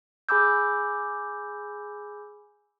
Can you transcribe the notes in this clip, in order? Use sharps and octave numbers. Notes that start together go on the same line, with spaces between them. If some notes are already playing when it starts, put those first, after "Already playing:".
G#4 G#5 B5 D6 E6 G6